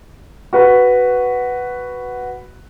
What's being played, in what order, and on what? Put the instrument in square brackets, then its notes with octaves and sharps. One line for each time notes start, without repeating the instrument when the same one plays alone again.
[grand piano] F#4 B4